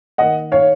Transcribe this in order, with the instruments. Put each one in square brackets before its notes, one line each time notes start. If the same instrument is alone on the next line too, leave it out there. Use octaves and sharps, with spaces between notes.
[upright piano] D#3 A#3 D#5 F#5
C#5 F5